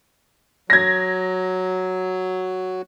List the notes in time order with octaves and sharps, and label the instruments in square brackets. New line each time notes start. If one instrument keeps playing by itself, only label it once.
[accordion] F#3 [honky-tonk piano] G#6 A#6